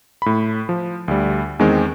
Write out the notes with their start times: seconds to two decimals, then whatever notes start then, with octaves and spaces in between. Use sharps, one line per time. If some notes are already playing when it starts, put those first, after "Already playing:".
0.22 A2 B5
0.69 F3
1.08 D2 G3
1.59 E2 D#3 G#3 C4